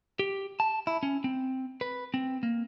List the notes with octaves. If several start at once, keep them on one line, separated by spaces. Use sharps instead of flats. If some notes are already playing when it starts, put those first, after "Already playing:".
G4
A5
E4
C#4
C4
B4
C4
A#3